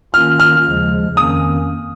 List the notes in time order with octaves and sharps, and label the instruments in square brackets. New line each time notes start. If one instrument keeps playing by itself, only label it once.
[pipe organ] D#3 A#3 C#4 F4 [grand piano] F6
[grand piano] F6
[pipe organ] D#2 C#3 F3 G#3
[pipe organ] F2 D#3 A#3 C#4 [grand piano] D#6